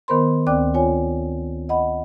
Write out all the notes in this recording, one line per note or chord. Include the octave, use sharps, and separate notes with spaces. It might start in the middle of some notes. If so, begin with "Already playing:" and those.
D#3 B3 A#4 C5 B5 C6
D2 C4 D5 G5 D6 F#6
F4 C#5 G#5
D#5 F#5 B5